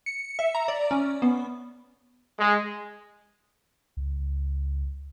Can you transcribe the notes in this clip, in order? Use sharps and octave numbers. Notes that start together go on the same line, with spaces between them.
C#7
E5
A#5
D5
C#4
B3
G#3
C#2